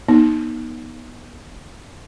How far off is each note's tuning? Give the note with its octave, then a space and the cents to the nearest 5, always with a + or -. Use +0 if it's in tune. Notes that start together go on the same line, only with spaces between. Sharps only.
B3 -30 D#4 +0